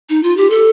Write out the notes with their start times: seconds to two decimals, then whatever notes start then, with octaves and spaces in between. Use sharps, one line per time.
0.10 D#4
0.23 F4
0.37 G4
0.50 A4